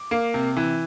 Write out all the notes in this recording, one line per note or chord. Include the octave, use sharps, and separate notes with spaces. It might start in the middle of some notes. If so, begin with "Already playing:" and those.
Already playing: D6
A#3
C3
E3